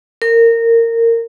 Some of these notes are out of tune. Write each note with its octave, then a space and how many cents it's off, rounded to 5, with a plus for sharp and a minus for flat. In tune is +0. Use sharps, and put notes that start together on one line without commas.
A#4 -20